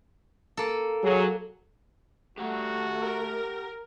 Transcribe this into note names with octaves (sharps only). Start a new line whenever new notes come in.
A#3 A4
F#3 G#4
A3 F#4 G4 F#5 A#5
A#4